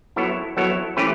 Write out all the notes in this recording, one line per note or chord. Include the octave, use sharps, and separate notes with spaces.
F#3 B3 E4 A4 C#5
F#3 B3 E4 A4 C#5
E3 A3 C#4 G4 B4